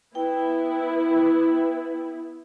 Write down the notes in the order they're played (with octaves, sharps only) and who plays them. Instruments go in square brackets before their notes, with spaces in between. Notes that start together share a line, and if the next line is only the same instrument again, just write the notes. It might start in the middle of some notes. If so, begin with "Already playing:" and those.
[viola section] B3 E4 [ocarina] B4 [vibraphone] G5